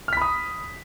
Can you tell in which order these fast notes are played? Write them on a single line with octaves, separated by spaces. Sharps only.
F6 B6 B5 D#6